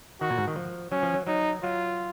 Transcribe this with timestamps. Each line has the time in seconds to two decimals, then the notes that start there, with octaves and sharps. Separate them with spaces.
0.21 D#3 F#4
0.30 A#2
0.38 G#2
0.48 D#3
0.56 F3
0.92 F#3 C#4
1.03 F3
1.14 F#3
1.27 F#3 D#4
1.63 F#3 F4